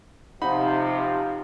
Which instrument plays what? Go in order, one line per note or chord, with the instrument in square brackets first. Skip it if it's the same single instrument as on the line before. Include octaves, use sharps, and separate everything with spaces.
[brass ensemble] C3 F3 [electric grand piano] D#4 B5 [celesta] F5 F#5